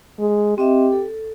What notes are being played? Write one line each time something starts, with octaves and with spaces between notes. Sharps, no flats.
G#3
C4 G4 D#5 E5
A4